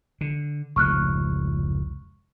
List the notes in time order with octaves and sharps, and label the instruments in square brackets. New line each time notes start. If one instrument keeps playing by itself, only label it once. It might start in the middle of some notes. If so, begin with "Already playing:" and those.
[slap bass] D3
[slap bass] F1 C#2 G#2 [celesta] C#6 F6 F#6